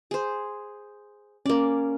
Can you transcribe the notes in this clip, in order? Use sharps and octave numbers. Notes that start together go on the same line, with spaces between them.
G#4 C5
A#3 C#4 D5